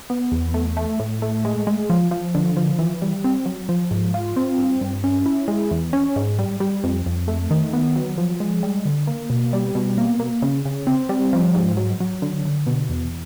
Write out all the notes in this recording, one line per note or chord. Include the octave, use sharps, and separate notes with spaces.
B3
E2
A3
A3
A2
A3
G#3
G#3
F3
F3
D3
F3
E3
G3
C4
F#3
F3
G#2
F4
C4
G2
G2
C#4
E4
G#3
E2
C#4
G#2
G3
G3
F2
F2
A3
D#3
B3
F#3
F3
G#3
G3
D3
A#3
B2
G3
B2
A#3
A#3
C#3
C#3
C4
G3
F3
G#2
F#3
F#3
D3
D3
B2
E2